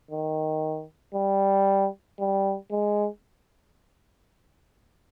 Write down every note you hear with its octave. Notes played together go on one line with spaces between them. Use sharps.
D#3
G3
G3
G#3